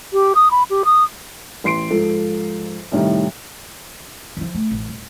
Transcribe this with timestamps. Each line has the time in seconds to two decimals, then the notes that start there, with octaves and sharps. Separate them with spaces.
0.13 G4
0.35 D#6
0.51 B5
0.70 G4
0.85 D#6
1.64 A1 C6 C7 D7
1.90 G#2 F3 A4
2.92 C2 A2 D#3 G3
4.37 E3 F3
4.55 A3
4.71 A1
4.88 D#1